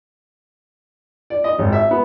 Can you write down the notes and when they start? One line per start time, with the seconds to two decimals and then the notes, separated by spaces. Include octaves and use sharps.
1.30 D5
1.44 D#5
1.59 G#1
1.72 E5
1.91 B3